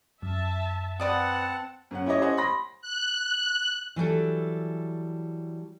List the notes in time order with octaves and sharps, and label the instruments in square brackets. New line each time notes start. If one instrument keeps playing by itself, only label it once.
[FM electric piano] F#2 [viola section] E5 A5
[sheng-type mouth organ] C4 A5 [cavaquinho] B4 D5 D#6 [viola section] F#5
[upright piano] F#2 C#4 F#5
C#4 E4 G4 C#5 D#5
C5 D#5 F#5 G#5
B5 C6 A#6
[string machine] F#6
[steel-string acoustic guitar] E3 F#3 G3 A4